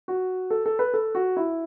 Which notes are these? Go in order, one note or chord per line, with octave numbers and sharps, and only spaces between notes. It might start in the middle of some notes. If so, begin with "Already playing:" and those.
F#4
A4
A4
B4
A4
F#4
E4